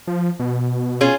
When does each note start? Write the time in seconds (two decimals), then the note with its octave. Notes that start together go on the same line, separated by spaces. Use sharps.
0.07 F3
0.40 B2
1.01 C#4 F4 G#4